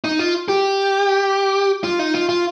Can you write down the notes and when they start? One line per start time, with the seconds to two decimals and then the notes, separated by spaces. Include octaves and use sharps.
0.04 D#4
0.19 F4
0.48 G4
1.84 F4
1.99 D#4
2.15 F4
2.29 F4